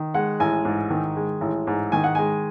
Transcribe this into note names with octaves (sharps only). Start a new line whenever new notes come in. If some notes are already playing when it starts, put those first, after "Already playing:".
Already playing: D#3
G#3 F#5
A1 G#5
G#2
D#3
G#3
A1
G#2
D#3 G#5
F#5
G#3 G#5